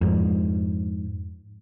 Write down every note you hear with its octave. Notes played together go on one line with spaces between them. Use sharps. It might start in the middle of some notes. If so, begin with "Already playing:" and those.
F2 G#2